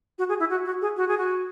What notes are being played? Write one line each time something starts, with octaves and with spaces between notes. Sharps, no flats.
F#4
G#4
E4
F#4
F#4
G#4
F#4
G#4
F#4